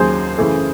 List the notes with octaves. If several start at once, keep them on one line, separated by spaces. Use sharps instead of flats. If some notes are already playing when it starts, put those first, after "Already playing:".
Already playing: D#2 C#3 F#3 G#4 C5
F#2 C#3 E3 A3